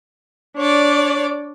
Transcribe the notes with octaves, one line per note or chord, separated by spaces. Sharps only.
D4 C#5 D5